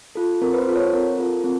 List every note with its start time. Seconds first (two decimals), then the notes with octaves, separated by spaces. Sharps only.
0.15 F4 A4
0.42 C4 A#4
0.53 B4
0.58 C5
0.67 F4 A4
0.76 C#5
0.93 C4 A#4
1.18 F4 A4
1.44 C4